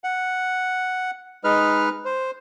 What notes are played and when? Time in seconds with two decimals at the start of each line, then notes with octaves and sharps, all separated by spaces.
0.04 F#5
1.44 G#3 D#4 B4 F6
2.05 C5